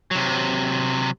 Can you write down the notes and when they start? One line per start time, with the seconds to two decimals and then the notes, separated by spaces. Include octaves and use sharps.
0.11 C3 F#3